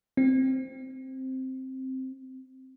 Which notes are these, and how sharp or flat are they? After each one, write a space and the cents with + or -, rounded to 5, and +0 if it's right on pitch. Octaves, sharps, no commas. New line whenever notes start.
C4 +0